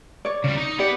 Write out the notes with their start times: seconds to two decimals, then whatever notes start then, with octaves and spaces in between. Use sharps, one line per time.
0.25 C#5 D5
0.44 C#3 G3
0.57 D#4
0.79 B3 G4 D5 F#5